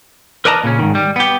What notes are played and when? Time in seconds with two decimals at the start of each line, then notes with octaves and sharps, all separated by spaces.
0.45 A#4 B4 D5 D#5 A5 A#5
0.64 A#2 C#3 C#4
0.79 G#2 D#3
0.95 G3
1.16 B3 G4